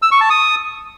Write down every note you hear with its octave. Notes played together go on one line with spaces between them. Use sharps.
E6
C#6
A5
D#6